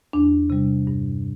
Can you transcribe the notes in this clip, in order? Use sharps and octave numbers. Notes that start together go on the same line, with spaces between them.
E2 D4
C3 G3
G2